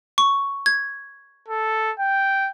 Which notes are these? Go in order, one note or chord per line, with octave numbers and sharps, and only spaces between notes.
C#6
G#6
A4
G5